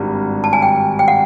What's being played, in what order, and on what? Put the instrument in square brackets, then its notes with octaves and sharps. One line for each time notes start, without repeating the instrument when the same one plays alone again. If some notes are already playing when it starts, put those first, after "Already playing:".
Already playing: [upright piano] G#1 G2
[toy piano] A5
G#5
G5
G5
F#5